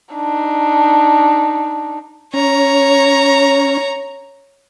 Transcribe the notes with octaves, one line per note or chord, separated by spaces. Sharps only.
D4 D#4
C#4 C#5 A#5